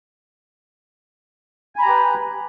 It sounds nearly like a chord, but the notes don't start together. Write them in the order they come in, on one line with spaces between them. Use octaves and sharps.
G#5 B5 A#5 G4 B4